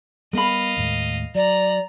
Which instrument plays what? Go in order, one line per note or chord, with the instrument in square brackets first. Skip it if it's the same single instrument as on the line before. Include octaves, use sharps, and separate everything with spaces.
[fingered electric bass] G3 B3 [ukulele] A#4 B5 [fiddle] D#5 F5
[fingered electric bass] D#2 A2 G#3
[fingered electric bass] F#3 [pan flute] D5 [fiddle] A#5